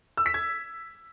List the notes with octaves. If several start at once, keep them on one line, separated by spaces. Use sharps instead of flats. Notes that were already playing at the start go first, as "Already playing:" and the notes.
E6
B6
G#6